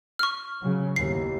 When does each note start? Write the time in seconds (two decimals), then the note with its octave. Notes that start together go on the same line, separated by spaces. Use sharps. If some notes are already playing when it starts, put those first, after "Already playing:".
0.19 C#6 F6
0.61 C#3 F#3
0.96 G1 D#2 E3 C7